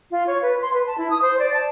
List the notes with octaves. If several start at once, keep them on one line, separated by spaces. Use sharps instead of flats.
F4
C#5
B4
C6
B4
A5
E4
D#6
C5
D5
A5